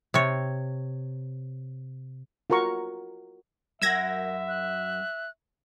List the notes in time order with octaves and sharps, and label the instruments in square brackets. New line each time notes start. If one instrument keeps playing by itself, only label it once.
[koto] C3 C#5
[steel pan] F4 F#4 A#4 A#5 C#6
[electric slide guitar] F#2 F#5 [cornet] E5 [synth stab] E6 G#6 A#6
[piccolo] F#6